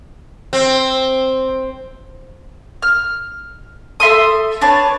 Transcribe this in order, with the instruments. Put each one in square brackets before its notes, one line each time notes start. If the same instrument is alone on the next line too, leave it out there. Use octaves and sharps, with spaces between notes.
[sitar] C4
[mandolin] F6
A4 E5 C6 D#6
D4 B4 C#5 A5